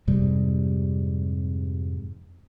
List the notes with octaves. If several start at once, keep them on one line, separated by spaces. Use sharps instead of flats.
F2 G#2 C3 G3